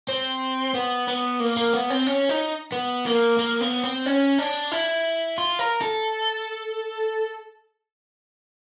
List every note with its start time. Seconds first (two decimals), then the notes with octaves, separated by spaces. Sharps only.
0.08 C4
0.75 B3
1.07 B3
1.40 A#3
1.57 A#3
1.74 B3
1.90 C4
2.07 C#4
2.29 D#4
2.72 B3
3.06 A#3
3.38 A#3
3.61 B3
3.83 C4
4.06 C#4
4.38 D4
4.72 E4
5.38 F4
5.59 A#4
5.81 A4